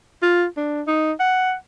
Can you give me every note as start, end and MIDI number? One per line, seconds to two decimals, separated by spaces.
0.22 0.45 65
0.57 0.82 62
0.87 1.12 63
1.20 1.53 78